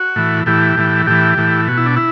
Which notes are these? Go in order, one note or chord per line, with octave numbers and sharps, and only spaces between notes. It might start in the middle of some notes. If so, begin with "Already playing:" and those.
Already playing: F#4
A2 E3
A2 E3 G4
A2 E3
A2 E3 G4
A2 E3
B2 F#4
E4
D4
E4